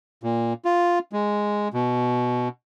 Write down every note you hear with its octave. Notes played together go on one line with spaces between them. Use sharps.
A#2
F4
G#3
B2